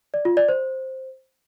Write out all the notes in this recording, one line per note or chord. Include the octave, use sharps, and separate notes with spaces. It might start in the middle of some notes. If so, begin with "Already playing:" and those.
D5
F4
D5
C5